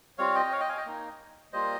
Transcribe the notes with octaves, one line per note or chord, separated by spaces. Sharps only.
G3 C4 F4 C#5 F5
D#5 G5
C#5 F5
D#5 G5
F5 G#5
D#5 G5
A#3 D#4
G3 A#3 F4 C5 D#5